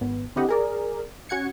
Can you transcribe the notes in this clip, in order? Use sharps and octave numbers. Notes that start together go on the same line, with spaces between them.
G#1 B3
D3 C4 E4 G4 D#5 F#5
G#4 A#4 D5
C#4 F#4 F#5 G#6 C#7